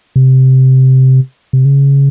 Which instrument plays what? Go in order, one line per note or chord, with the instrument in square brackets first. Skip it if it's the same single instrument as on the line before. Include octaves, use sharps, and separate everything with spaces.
[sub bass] C3
C3
C#3